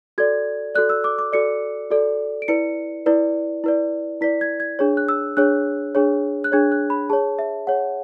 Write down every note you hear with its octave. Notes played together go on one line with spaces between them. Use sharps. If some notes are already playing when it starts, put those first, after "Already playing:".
F#4 A4 D5 G#6
F#4 A4 D5 F#6
E6
D6
D6
F#4 A4 D5 C#7
F#4 A4 D5
D7
E4 B4 D5 C#7
E4 B4 D5
E4 B4 D5
E4 B4 D5 B6
G#6
G#6
D4 G#4 C#5
F#6
E6
D4 G#4 C#5 F#6
D4 G#4 C#5
F#6
D4 G#4 C#5 G#6
F#6
B5
G#4 C#5 A5
E5
G#4 C#5 F#5